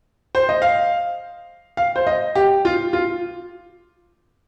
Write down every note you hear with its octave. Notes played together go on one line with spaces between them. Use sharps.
C5
D#5
F5
F5
C5
D#5
G4
F4
F4